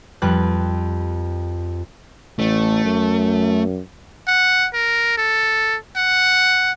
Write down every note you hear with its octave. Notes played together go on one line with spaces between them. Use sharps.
F2 G3 B4 F#6
A1 A3
F#2
F#5
A#4
A4
F#5